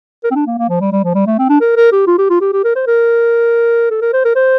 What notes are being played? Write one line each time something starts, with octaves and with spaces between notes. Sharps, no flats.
A#4
C4
D4
A#3
A#3
F3
G3
G3
F3
G3
A3
C4
D4
A#4
A#4
G4
F4
G4
F4
G4
G4
A#4
C5
A#4
A4
A#4
C5
A#4
C5